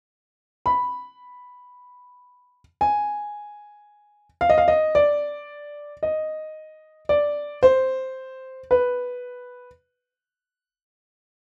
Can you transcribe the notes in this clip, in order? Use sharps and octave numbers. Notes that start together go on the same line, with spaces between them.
B5
G#5
F5
D#5
F5
D#5
D5
D#5
D5
C5
B4